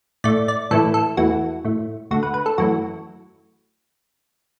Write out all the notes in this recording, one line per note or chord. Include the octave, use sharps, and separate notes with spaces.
A2 A3 D5
D5
A2 E3 A3 A4
A4
E2 E3 A3 F#4
A2 A3
D2 D3 A3 F#4
B4
B4
A4
F#2 E3 A3 F#4